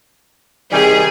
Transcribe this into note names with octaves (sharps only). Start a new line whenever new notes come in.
C3 D#3 G3 G#4